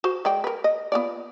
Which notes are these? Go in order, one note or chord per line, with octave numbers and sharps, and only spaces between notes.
F#4 C5
G#3 D5 G5
A#4 B4
D#5
B3 F4 D5